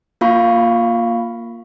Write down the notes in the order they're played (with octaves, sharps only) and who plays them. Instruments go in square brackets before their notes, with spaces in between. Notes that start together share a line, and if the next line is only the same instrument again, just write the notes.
[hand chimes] A#3 F4 F5 B5 C#6